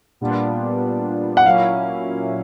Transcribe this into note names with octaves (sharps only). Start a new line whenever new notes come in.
A#2 G3 B3 D4 F4
F#5
A#2 F#3 A#3 C#4 E4 F5